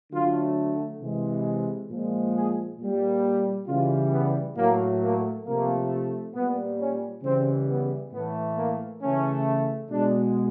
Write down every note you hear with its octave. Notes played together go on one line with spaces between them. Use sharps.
D3 F#3 A3 F4
C3 E3 G#3
A#2 F3 G#3
G#4
A#2 G3
C#3 E3 G3 F4
B3
A2 F#3 A3 A#3
A#3
C3 F3 A3 A#3
A#2 G3 B3
C#4
C#3 E3 G3 C4
B3
A2 E3 A3 B3
A#3
C#3 E3 A3 C#4
B2 G#3 D4